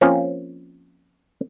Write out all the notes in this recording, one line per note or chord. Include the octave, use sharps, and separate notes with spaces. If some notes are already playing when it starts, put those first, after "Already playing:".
F3 A#3 C4 C#4 F4